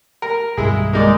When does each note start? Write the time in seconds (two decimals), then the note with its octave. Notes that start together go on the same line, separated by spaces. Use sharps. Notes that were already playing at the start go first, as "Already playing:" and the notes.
0.22 A#4
0.57 B1 G2 D#3 G#3 E4 G#4
0.93 G#3 A#3 D#4 D5